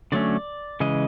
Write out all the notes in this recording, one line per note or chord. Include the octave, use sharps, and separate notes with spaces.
D3 F#3 A3 C#4 D5
C#3 E3 G#3 D#5